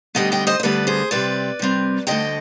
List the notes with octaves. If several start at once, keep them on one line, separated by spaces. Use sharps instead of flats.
D2 D3 G3 B3 D#5 G5
D#5 G5
C5 D#5
D#5
D2 D3 G3 B3 B4 D5
G#4 C5
C3 G3 C4 B4 D5
C3 G3 C4
D2 D3 F3 D#5 G5